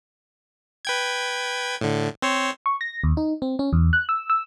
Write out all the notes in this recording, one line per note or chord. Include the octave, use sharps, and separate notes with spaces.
B4 G5 G#6
A2 D3
C4 C5 C#5
C#6
A#6
D#2
D#4
C4
C#4
E2
F#6
E6
E6